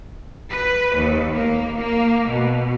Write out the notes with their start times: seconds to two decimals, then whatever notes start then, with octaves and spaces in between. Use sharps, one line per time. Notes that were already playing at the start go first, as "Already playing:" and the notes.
0.51 B4
0.97 D#2
1.35 A#3
1.78 A#3
2.29 B2